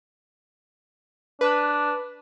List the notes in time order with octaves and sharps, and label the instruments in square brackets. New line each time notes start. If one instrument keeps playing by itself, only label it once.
[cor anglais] D4 [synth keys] B4